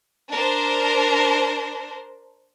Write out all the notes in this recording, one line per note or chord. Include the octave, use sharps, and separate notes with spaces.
D4 A#4 C5